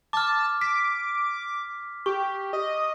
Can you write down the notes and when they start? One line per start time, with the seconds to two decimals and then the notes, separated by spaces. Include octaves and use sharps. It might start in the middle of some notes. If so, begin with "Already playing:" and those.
0.13 A5 D6 F6
0.61 D6 B6
2.06 G4 C#6
2.53 D#5